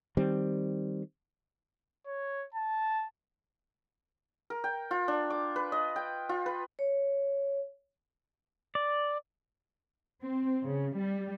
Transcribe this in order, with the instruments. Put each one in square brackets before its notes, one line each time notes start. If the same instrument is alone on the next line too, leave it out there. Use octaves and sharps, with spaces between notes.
[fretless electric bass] D#3 G3 C4
[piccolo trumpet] C#5
A5
[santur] A#4
G5
F4
D4
D6
B4
D#5
G5
F4
B4
[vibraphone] C#5
[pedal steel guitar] D5
[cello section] C4
C#3
G3